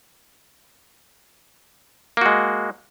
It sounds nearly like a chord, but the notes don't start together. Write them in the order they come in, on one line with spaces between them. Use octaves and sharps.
A#3 F#4 G#3